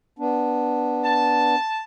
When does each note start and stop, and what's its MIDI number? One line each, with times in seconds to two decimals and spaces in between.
0.19 1.55 59
0.19 1.55 62
1.04 1.81 81